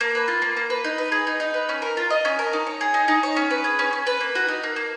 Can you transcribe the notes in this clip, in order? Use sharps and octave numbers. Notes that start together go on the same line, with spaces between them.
A#3
B4
F4
A#3
A#3
B4
D#4
B4
G#4
D#4
D#4
B4
C#4
A#4
F4
D#5
C#4
A#4
D#4
C#5
G#4
D#4
D#4
C#5
C#4
B4
G#4
C#4
C#4
B4
A#3
F#4
D#4
A#3
A#3